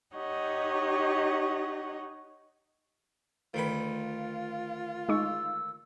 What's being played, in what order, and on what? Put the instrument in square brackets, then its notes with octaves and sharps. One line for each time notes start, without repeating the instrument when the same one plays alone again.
[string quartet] D#4 G4 C#5 D#5 F#5
[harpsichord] D2 D#3 B4 [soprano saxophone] F4
[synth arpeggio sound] G#3 D#4 C#6 [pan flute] E6